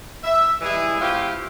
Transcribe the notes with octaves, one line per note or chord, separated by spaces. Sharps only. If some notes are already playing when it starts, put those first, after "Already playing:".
E5
E3 G3 G#3 E4 G#4
A3 C4 E4 F4 G4